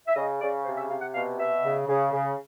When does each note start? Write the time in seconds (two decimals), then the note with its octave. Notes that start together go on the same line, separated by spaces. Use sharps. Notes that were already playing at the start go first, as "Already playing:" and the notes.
0.07 E5
0.16 C#3 D#5
0.41 C#3 D5
0.64 C3 C5
0.77 E5
0.89 C3 F5
1.01 F#5
1.14 B2 F5
1.38 B2 E5
1.63 C#3
1.87 C#3
2.12 C#3